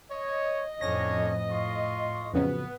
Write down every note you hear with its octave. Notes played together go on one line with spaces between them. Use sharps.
C#5 D#5
F2 A2 C#4 D4 C#5 A#6
A2 F4 C6 C#6
F2 C#3 F#3 B3 B4